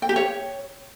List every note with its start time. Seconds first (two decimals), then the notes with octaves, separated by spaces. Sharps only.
0.02 G5
0.09 G4
0.16 C#5